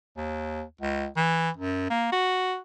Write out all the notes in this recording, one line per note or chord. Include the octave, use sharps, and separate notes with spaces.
D#2
C#2
E3
F#2
A#3
F#4